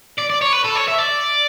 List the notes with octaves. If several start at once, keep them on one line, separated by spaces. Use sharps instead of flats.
D5
D5
C#5
B4
A4
C#5
E5
D5